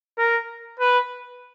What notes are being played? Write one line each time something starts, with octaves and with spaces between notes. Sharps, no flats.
A#4
B4